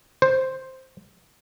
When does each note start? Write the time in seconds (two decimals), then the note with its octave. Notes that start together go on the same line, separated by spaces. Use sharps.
0.22 C5